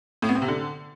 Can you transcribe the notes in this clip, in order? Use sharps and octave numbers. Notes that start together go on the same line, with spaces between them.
A2
B3
C4
C3
D3